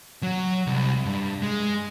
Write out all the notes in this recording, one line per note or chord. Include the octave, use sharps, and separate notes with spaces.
F#3
C2
G2
G#3